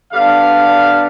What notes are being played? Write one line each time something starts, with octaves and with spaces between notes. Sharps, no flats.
D3 G3 B3 D4 F5